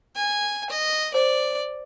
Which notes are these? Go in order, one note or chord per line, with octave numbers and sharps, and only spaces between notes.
G#5
D#5
C5 D5